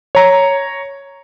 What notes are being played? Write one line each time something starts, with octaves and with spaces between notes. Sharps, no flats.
C#5 A#5